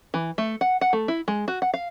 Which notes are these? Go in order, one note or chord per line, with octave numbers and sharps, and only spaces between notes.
E3
A3
F#5
F#5
A3
E4
G#3
F#4
F#5
F5